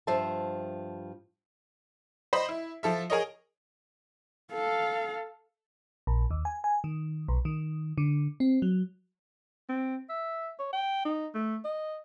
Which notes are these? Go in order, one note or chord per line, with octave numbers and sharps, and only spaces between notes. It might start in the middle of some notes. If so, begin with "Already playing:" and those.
G2 F3 C5 E5 A5
C5 D#5 B5
E4
F3 A4 E5
G#4 A#4 C#5 D#5
A4 F5
A#1
D#2
G#5
G#5
D#3
B1
D#3
D3
C4
F#3
C4
E5
C#5
G5
D#4
A3
D#5